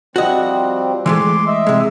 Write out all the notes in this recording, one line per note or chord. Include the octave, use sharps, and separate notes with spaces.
F3 G3 C4 F#4 D#5
E3 G#3 A3 C6 D6
D#5 E5 E6
C3 G#3